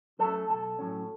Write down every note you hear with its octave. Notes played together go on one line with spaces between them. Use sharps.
F#3 A3 C#4 A4
B1 A4
A2 F#3 C#4